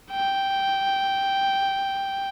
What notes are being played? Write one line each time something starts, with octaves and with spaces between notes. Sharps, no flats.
G5